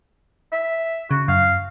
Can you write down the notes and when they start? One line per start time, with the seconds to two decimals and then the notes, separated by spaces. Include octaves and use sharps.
0.52 E5
1.11 C#3 F#4
1.28 F#2 F5